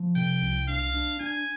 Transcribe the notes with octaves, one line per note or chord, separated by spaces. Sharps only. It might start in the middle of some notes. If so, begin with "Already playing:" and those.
Already playing: F3
C3 G5
C2
D4 F5
D4
D4 G#5